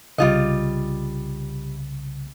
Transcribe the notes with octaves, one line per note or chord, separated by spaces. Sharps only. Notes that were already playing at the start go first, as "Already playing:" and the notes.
C2 C#3 G3 F4 D#5